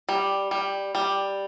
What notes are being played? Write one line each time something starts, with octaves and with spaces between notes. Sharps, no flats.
G3
G3
G3